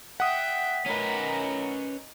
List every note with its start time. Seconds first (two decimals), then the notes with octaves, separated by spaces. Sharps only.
0.20 E5 F#5 G5 D#6 B6
0.86 C#4 D#4 A#4 B4